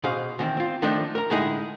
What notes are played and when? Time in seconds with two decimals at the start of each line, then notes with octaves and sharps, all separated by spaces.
0.04 B2 G#4 C5 F5
0.39 E2 D#3 C4
0.57 C4 F4
0.82 D#3 F3 A3 D4 D#4
1.15 A#4 A#5
1.30 A2 D3 G#3 D#4 E4 G#4